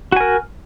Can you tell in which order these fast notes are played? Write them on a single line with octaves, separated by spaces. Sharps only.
F#4 G#5 A#4